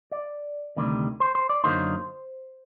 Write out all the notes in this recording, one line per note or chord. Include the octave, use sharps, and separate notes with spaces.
D5
D2 C3 D#3 G3
C5
C5
D5
F#2 D3 F#3 A#3 D#4 C5